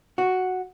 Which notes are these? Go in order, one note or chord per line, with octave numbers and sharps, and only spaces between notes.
F#4